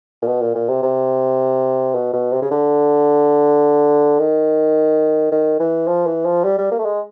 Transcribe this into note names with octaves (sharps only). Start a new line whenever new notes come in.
A#2
B2
A#2
A#2
C3
C3
B2
B2
C3
C#3
D3
D#3
D#3
E3
F3
E3
F3
G3
G3
A#3
A3
G#3